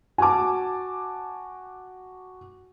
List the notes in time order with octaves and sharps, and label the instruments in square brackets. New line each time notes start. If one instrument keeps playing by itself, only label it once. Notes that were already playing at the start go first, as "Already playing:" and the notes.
[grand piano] F#4 D6 [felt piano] G#5 A5